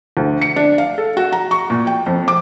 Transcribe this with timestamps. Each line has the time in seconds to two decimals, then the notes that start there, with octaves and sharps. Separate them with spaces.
0.17 D2
0.41 C#7
0.56 D4
0.78 F5
0.98 A4
1.17 F#4
1.32 A#5
1.51 C#6
1.70 A#2
1.87 G5
2.06 F2
2.28 D6